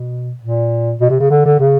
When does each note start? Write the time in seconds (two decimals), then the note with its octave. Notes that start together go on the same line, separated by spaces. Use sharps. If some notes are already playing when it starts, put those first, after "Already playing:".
Already playing: B2
0.41 A#2
1.01 B2
1.10 C3
1.20 C#3
1.30 D3
1.45 D3
1.59 C#3